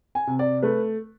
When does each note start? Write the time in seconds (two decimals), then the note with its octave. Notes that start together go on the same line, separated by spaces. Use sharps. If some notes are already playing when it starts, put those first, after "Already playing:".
0.15 G#5
0.27 C3
0.39 D5
0.62 A3 B4